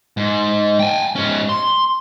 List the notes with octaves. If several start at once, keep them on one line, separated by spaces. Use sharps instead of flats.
G#2
G5 G#5
G#2 C#4
C6